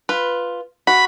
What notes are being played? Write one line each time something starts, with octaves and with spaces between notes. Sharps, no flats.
F4 B4
F#4 B5